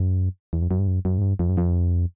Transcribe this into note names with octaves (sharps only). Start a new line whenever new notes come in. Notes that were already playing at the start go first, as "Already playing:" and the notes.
Already playing: F#2
E2
F2
F#2
G2
F#2
F#2
G#2
G2
F2
F#2
F2